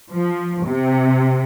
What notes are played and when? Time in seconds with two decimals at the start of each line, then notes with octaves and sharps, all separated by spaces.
0.14 F3
0.66 C3